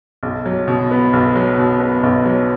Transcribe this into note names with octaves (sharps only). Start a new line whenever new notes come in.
B1
F#3
B2
B3
B1
F#3
B2
B3
B1
F#3